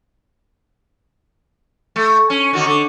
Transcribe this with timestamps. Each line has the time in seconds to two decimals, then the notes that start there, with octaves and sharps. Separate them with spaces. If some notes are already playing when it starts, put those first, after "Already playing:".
1.96 A3
2.30 C#4
2.53 D3 D#3 F#4
2.66 D3